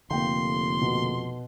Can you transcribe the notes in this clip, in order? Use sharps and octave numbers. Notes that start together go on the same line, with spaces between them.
F1 D3 A#3 G5 C6
B2